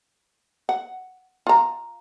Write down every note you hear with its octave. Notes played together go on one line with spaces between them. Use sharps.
F#5
F4 A#5